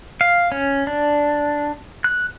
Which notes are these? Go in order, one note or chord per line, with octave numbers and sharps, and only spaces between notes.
F5
C#4
D4
F#6